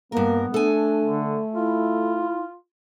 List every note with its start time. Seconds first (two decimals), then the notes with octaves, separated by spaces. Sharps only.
0.12 G2 A#3 B3 A#4
0.54 A3 D4 A4 G#5
1.04 D3
1.55 E4 F4